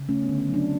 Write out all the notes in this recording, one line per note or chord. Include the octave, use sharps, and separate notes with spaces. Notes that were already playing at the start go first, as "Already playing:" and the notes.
Already playing: C#3
A3 C#4
B3
D3
C#4
F#3
D4